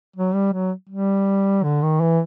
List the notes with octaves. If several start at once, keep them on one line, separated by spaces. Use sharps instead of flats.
F#3
G3
F#3
G3
D3
D#3
E3